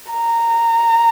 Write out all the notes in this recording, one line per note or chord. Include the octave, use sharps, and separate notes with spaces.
A#5